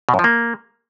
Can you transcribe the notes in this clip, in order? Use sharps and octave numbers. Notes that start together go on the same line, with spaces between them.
B2
F#2
F3
A#3